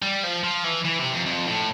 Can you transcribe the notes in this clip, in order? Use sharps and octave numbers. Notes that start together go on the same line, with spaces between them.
G3
F3
F3
E3
E3
C3
F2
F2
A2